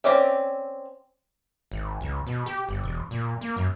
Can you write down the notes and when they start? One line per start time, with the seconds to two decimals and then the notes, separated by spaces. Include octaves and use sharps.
0.04 C4 C#4 D5 E5
1.72 G#1
2.01 C#2
2.27 B2
2.46 G4
2.69 G1
2.84 E1
3.11 A#2
3.41 A#3
3.56 F#2